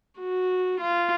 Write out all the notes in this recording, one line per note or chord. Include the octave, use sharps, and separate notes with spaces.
F#4
F4